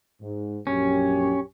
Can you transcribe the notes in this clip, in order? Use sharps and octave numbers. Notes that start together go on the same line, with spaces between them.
G#2
A#1 F#2 C#4 G4